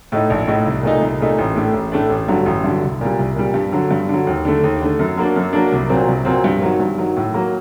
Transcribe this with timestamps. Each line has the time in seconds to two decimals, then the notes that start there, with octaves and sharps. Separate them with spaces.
0.12 A2 A3 D#4
0.30 A#1
0.47 A2 A3 D#4
0.66 C2
0.83 A#2 A3 D#4
1.01 C2
1.20 A#2 A3 D#4
1.38 A1
1.56 A2 A3 D4
1.73 A1
1.92 A2 A3 D4
2.10 A1
2.28 G2 D3 F#3
2.46 A1
2.64 G2 D3 F#3
2.82 C2
3.01 A#2 G3
3.19 C2
3.36 A#2 G3
3.54 G2
3.72 D3 F#3
3.91 G2
4.09 D3 F#3
4.27 D#2
4.45 D3 A3
4.63 D#2
4.82 D3 A3
4.99 F#2
5.17 F#3 A#3 D4
5.36 F#2
5.53 F#3 A#3 D4
5.72 C2
5.89 A#2 F#3 C4
6.08 C2
6.25 A#2 F#3 C4
6.44 G2
6.62 D#3 F#3
6.80 G2
6.98 D#3 F#3
7.16 A2
7.34 F#3 A#3